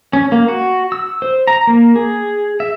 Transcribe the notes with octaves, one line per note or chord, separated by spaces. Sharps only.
C#4
A#3
F#4
E6
C5
A#5
A#3
G#4
E5